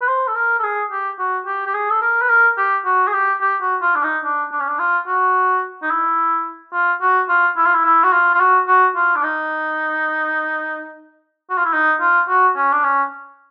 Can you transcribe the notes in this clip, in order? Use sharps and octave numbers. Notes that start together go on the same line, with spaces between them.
B4
C5
A4
A#4
A4
G#4
G4
F#4
G4
G4
G#4
A4
A#4
B4
A#4
G4
F#4
G#4
G4
G4
F#4
F4
D4
D#4
D4
D4
C#4
D4
F4
F#4
D#4
E4
F4
F#4
F4
E4
F4
E4
E4
F#4
F4
F4
F#4
F#4
F4
D4
D#4
F#4
F4
E4
D#4
F4
F#4
C#4
D4
C#4